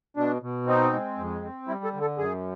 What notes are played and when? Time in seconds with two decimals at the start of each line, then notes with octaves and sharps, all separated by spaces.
0.17 B2 D4
0.42 B2
0.67 C4 D#4
0.93 G#3
1.18 F2
1.43 C4
1.68 G3 E4
1.84 A4
1.93 D3
2.01 A4
2.18 F#2 G#4